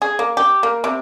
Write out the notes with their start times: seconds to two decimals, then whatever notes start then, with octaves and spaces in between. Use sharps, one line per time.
0.02 G#4
0.19 A#3
0.37 G4
0.63 A#3
0.84 C3